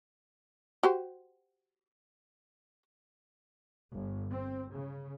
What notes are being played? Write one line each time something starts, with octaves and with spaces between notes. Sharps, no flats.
F#4 G4 C5
G1
C4
C#3